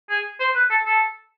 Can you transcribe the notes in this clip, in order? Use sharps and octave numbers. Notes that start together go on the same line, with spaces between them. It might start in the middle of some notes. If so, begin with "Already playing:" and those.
G#4
C5
B4
A4
A4